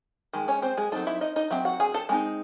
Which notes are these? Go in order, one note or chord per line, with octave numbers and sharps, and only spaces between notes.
D#3 G#3
C#4 C#5
C4 C5
G#3 G#4
F#3 A3 C4 D#4 A4
E4 E5
D#4 D#5
D#4 D#5
F#3 C4 E5
F#4 F#5
G#4 G#5
A4 A5
G#3 C4 D#4